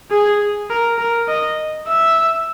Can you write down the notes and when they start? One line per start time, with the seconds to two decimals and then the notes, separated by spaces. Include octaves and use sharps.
0.11 G#4
0.70 A#4
0.99 A#4
1.28 D#5
1.87 E5